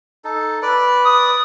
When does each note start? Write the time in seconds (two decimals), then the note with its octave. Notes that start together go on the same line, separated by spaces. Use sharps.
0.24 D#4 A4
0.62 B4 D5
1.05 D#6